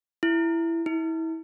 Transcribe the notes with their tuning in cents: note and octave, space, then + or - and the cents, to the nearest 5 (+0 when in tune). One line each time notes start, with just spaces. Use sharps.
E4 +10
E4 -30